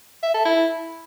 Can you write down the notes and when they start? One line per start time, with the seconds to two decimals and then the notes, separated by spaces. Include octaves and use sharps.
0.23 E5
0.34 A4
0.46 E4